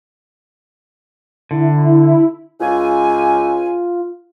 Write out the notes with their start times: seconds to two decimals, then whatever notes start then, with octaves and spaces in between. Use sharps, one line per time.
1.51 D3 E4
2.60 C#2 F4 G#5